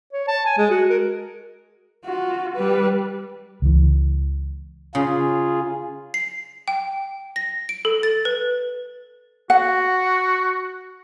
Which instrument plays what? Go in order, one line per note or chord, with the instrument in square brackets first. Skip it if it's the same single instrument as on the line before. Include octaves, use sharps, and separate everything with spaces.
[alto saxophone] C#5
A5
G#5
G#3
F#4
A#4
[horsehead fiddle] F4 F#4
G3 B4
[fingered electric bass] C#2 E3
[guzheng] C#3 [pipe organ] F4 G#4
[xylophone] C7
G5
A#6
D7
A4
A6
B4
[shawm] F#4 [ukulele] F#5